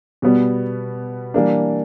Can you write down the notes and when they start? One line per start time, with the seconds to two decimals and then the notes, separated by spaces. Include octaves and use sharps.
0.22 B2 G3 B3
1.34 E3 G3 A#3 D4